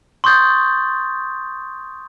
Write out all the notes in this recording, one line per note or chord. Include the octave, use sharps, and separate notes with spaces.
C6 C#6 D#6 G6 A6